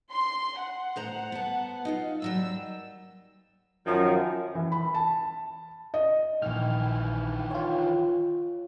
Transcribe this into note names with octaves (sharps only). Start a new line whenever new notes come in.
C6
F#5
A2 C5 A#5
B3 A5
D#4 F4 F5
D#2 F#3 G3 E6
F#2 D#3 F3
E3
B5
A5
D#5
A#1 D#3 E3 F6
F4 C#5